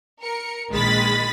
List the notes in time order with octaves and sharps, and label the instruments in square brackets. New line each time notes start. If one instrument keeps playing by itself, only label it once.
[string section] A#4 C#7
A#1 D#3 G#3 B5 A6 B6